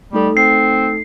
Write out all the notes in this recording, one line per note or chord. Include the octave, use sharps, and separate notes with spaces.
G3 A3 D#4 A4
C4 C7